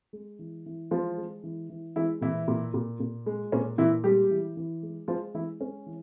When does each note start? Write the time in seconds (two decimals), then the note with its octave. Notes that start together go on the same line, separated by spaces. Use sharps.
0.13 G#3
0.39 E3
0.66 E3
0.91 F3 G#3 F4
1.17 G#3
1.44 E3
1.69 E3
1.96 E3 G#3 E4
2.21 A#2 E3 E4
2.48 A#2
2.74 A#2
3.00 A#2
3.26 G#3
3.52 A#2 C#4
3.78 A#2 E3 E4
4.04 G3 G#3 G4
4.31 E3
4.57 E3
4.83 G#3
5.08 F3 G#3 F4
5.34 E3 G#3 E4
5.60 G#3 C#4
5.86 E3